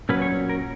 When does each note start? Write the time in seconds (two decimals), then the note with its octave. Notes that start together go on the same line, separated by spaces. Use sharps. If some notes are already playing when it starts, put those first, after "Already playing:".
0.09 A#2 F#3 C#4 B4
0.22 C#5
0.49 A#4